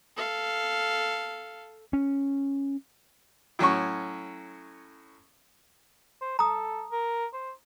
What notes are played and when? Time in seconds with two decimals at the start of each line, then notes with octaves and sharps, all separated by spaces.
0.17 A4 F5
1.93 C#4
3.59 A2 F#3 C#4 C#6
6.21 C5
6.39 A4 A#5 D#6
6.92 A#4
7.33 C5